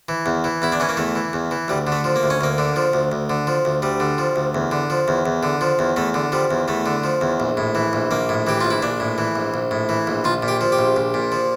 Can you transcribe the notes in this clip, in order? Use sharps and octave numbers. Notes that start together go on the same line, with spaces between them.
E3
E2
E3
E2 E4
D4
E3 C#4
A#3
E2 A3
E3
E2
E3
D2 G3
D3
A3
F3
A#3
D2
C#4
D2 A#3
D3
F3
D2
D2
D3
F3
D2
D2 G3
D3
F3
D2
E2
D3
F3
E2
E2
D3
F3
E2
E2 A3
D3
F3 G3
E2
E2 A3
D3
F3
E2
A#1
A2
E3
A#1
A#1 A#3
A2
E3 G4
A#1 F4
E4
A#1 D4
A2
E3
A#1
A#1
A2
E3
A#1
A#1 F4
A#2
G4
F3
G4
A#1
A#1
A#2
F3